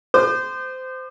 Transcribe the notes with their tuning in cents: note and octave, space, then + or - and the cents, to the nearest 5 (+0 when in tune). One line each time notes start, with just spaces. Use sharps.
C5 -20 D6 +45